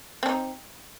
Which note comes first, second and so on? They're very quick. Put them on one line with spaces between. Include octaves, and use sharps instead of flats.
C4 D4 D#4